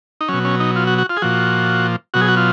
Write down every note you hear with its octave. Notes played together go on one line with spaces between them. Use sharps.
D#4
B2 F#3 C#4
C#4
D#4
F4
F#4
F#4
F4
G#4
A#2 F3 F#4
B2 F#3 F#4
G#4
F#4
F4